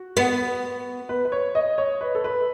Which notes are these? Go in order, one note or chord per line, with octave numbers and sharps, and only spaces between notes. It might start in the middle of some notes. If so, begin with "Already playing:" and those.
Already playing: F#4
B3
B4
B4
C#5
D#5
C#5
B4
A4
B4